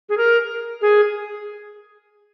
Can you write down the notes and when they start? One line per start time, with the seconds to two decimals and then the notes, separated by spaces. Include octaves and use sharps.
0.09 G#4
0.18 A#4
0.82 G#4